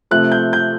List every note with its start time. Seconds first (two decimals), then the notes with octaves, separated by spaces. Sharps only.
0.11 C3 F3 A3 F#6
0.32 G6
0.53 G6